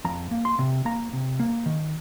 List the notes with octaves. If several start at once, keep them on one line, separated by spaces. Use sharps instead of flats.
F2 A#5
A#3
C6
C3
A#3 A#5
C3
A#3
D#3